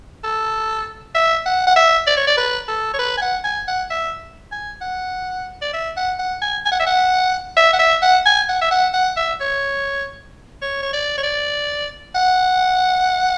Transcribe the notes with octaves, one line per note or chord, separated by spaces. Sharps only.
A4
E5
F#5
F#5
E5
D5
C#5
D5
B4
A4
C#5
B4
G#5
F#5
G#5
F#5
E5
G#5
F#5
D5
E5
F#5
F#5
G#5
G#5
F#5
E5
F#5
E5
F#5
E5
F#5
G#5
F#5
E5
F#5
F#5
E5
C#5
C#5
C#5
D5
C#5
D5
F#5